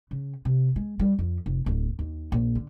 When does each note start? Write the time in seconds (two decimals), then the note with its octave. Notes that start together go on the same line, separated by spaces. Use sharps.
0.11 C#3
0.45 C3
0.76 G#3
0.99 G3
1.19 F2
1.46 F1
1.66 D1
1.99 D#2
2.32 A#1
2.55 D3